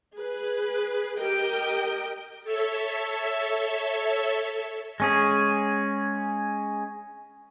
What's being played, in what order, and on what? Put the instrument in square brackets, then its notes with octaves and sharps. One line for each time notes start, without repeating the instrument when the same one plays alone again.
[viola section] G#4 B4
G4 A#4 D#5 G5
[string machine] A4 C#5 E5
[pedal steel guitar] G#3 C#4 G#4